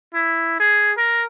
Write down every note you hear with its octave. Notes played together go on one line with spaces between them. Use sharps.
E4
G#4
A#4